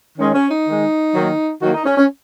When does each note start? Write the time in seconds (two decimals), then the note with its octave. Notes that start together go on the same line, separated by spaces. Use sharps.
0.18 D#3 G#3 C#4
0.34 C#4
0.50 D#4
0.66 D#3 G#3
1.14 D#3 F#3 A#3
1.62 D#3 F#3 A#3 F#4
1.74 D#4
1.85 C#4
1.98 C#4